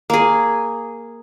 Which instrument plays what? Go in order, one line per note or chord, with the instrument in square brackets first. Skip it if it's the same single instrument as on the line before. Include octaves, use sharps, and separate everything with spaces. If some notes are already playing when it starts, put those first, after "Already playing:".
[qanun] A#3 G#4